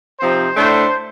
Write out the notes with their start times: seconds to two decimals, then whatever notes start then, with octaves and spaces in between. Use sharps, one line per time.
0.19 C3 F3 C4 D#4 C5
0.56 A2 A3 D4 C5